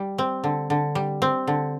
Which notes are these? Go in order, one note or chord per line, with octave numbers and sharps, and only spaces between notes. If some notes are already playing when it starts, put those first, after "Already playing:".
Already playing: G3
C4
D3
D3
G3
C4
D3